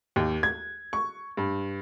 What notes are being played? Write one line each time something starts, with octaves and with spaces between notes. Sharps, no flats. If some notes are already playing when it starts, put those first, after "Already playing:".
D#2
G#6
C#6
G2